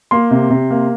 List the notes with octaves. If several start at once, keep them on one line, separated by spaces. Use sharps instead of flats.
A#3 C6
C3
C3
A#3